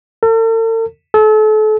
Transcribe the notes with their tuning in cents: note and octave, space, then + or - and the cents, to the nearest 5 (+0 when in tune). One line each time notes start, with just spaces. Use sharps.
A4 +45
A4 -35